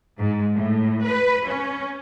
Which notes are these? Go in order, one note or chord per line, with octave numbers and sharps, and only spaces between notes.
G#2
A2
B4
C#4